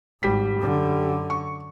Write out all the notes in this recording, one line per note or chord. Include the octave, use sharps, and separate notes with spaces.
G#1 G3 B6
F#2 D3
C#6